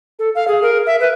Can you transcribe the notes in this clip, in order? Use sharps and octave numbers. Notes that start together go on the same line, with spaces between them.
A4
F5
G#4
A#4
E5
B4